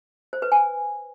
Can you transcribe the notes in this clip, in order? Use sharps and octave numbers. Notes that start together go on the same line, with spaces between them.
C5
B4
G#5